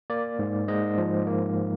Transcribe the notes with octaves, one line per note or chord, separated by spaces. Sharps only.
A#3 D5
G#2
G#2 D#5
F3
A#3